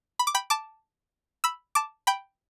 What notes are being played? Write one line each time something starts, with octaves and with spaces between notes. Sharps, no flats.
B5
D6
G5 B5
A5 D6
B5 E6
A5 D6
G5 B5